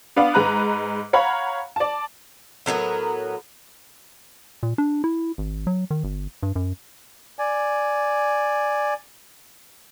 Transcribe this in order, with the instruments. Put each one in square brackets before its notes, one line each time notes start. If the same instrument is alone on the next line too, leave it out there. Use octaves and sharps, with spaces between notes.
[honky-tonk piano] B3 D4 F5
G#2 G#3 B4 A#5 F#6
C#5 F5 F#5 A#5 B5
D5 A5
[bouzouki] A2 F#3 B3 A#4
[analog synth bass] A#2
D4
E4
G#1
F#3
D#3
G1
G2
F#2
[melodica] D5 G#5